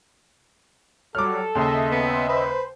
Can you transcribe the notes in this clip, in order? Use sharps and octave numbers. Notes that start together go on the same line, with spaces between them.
F#3 G3 A4 D6 F6
D#2 C#3 D#5 E5 C6
B3
B4 C5